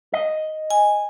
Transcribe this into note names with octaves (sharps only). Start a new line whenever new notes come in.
D#5
G#5